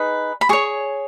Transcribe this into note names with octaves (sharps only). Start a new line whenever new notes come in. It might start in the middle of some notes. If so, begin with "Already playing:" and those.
Already playing: D#4 G#4 B4
B5
G#4 C#5 C#6